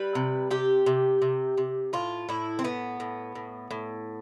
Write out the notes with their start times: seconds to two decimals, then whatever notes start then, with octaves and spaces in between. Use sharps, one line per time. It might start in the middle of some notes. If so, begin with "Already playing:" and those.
Already playing: G3 B4
0.15 C3
0.51 C3 G4
0.86 C3
1.22 C3
1.58 C3
1.93 A2 F4
2.29 A2 E4
2.59 C4
2.64 A2 B3
3.00 A2
3.35 A2
3.71 A2